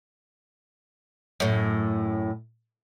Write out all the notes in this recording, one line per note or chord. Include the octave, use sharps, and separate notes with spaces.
F#2 A2